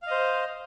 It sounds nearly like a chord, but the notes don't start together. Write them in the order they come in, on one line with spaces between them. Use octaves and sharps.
F5 D#5 C5